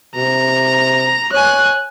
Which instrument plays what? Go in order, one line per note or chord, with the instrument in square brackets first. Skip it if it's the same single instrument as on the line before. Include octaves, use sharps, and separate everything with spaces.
[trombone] C3 [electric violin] A#5
[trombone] C#5 [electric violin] G#5 F#6